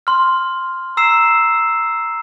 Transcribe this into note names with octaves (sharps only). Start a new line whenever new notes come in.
C6 F6
A#5 E6 C7 E7